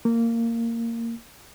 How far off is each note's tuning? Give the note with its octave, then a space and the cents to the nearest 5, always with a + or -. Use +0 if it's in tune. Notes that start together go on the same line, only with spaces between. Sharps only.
A#3 -15